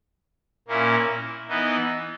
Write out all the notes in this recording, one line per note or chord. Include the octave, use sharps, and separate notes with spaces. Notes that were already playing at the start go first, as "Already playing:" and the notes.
A#2 A#3 C#4 E4
E3 B3 D#4